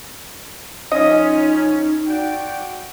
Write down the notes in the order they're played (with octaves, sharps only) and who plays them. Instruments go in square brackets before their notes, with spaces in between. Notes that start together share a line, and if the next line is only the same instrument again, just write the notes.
[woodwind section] F3 C#4 [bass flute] D#4 [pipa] D#5
[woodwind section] F#4 D5 G5